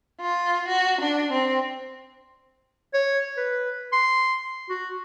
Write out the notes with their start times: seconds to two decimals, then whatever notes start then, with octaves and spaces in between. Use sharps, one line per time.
0.20 F4
0.68 F#4
1.01 D4
1.32 C4
2.94 C#5
3.37 B4
3.93 C6
4.69 F#4